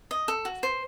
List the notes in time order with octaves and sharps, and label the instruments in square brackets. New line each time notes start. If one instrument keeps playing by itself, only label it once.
[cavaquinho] D#5
A4
F#4
C5